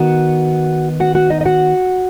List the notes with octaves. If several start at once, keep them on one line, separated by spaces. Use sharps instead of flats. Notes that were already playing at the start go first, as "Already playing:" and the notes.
Already playing: D#3 B3 F#4 F#5
F#4 F#5
F#4 F#5
D#4 D#5
D#5
F#4 F#5